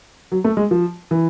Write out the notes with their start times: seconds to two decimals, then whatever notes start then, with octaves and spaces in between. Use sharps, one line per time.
0.32 F#3
0.44 A3
0.57 G#3
0.71 F3
1.11 E3